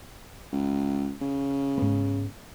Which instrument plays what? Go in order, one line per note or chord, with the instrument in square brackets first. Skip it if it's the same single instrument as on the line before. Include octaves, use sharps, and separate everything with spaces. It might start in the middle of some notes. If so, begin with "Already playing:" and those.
[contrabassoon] C#2
C#3
[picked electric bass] G#2 B3